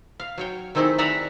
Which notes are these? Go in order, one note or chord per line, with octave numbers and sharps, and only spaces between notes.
F5
F#3 C#5 G5
D#3 A3 C4 D#4 E4 G#4
B4 D5 E5 F#5 G#5 A#5